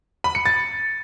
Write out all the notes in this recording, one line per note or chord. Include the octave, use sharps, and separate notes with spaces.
B5
C#7
A6